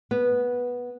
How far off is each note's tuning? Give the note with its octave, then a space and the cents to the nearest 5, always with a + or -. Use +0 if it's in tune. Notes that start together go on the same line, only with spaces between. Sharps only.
B3 -10